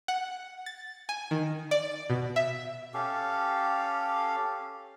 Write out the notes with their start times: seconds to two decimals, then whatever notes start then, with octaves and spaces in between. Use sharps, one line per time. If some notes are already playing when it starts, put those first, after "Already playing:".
0.08 F#5
0.66 A6
1.09 G#5
1.31 D#3
1.71 D5
2.10 B2
2.36 E5
2.94 C#4 G4 A4 F5